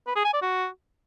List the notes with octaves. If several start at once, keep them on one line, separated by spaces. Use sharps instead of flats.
B4
G#4
G#5
D5
F#4